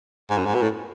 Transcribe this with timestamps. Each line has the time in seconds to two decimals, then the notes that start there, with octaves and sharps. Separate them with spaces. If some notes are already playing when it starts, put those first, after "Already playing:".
0.30 G#2
0.38 F#2
0.46 G#2
0.54 B2
0.62 A2